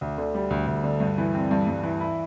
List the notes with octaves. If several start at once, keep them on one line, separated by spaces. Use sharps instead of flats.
D2
D3
G3
D2
D2
D3
G2
E3
C4
G2
G2
E3
E4